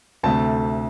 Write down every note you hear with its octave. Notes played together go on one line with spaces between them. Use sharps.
D2 C3 A3 A5